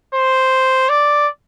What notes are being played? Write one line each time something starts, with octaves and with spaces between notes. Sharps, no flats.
C5
D5